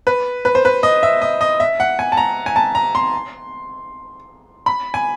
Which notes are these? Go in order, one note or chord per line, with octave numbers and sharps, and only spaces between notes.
B4
B4
C5
B4
D#5
E5
D#5
D#5
E5
F#5
G#5
A5
A#5
G#5
A5
A#5
C6
B5
G#5